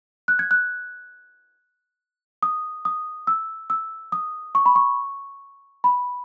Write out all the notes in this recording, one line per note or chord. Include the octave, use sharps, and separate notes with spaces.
F#6
G#6
F#6
D#6
D#6
E6
E6
D#6
C#6
B5
C#6
B5